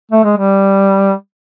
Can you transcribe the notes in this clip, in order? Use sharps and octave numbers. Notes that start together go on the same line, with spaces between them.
A3
G#3
G3